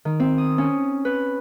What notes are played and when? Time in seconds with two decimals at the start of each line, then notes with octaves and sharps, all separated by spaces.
0.05 D#3
0.20 C4
0.38 D#6
0.58 C#4
1.05 B4